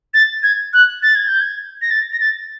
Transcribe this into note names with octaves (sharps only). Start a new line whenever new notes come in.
A6
G#6
F#6
A6
G#6
G6
G#6
A#6
A6
A#6
A6